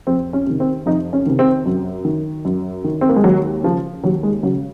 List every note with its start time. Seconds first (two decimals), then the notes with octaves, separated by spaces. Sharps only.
0.07 F2 C4
0.33 C#4
0.47 C3 D#3
0.60 C4
0.86 F2 D#4
1.13 C#4
1.26 C3 D#3
1.39 C4
1.66 F#2
2.05 D#3
2.45 F#2
2.84 D#3
3.01 C4
3.09 A#3
3.16 G#3
3.24 D#2 F#3
3.63 C#3 F3
4.03 D#2 F#3
4.23 G#3
4.43 C#3 F#3